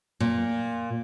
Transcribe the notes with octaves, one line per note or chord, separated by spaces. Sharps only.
A#2